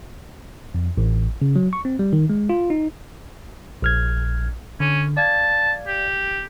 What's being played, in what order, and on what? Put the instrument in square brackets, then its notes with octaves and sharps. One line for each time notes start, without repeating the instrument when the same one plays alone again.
[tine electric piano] F2
A1
C#3
F#3
C#6
C4
G3
D#3
G#3
F4
D#4
A#1 F6 G#6
[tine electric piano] D3 [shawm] C#4
[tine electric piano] D5 F5 G#6 [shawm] A5
[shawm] G4